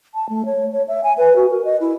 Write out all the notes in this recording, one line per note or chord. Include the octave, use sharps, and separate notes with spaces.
A5
A3
C#5
C#5
E5
G#5
B4
F#4
A#4
D#5
E4